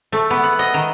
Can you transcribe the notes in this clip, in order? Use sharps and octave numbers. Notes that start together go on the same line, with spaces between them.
A3
B3
F#5
D#5
D#3